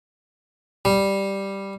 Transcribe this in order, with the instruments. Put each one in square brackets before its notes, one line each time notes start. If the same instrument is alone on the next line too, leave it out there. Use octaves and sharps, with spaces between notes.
[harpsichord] G3